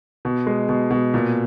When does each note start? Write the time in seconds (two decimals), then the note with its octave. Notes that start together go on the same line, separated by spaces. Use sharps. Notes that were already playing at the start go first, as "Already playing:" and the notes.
0.25 B2
0.47 G#3
0.69 B2
0.91 B2
1.14 A#2